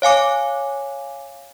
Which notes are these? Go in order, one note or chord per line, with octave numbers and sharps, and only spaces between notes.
C#5 F5 G#5 D6